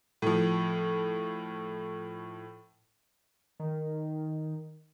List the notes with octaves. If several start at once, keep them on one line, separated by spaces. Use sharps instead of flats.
A2 F3
D#3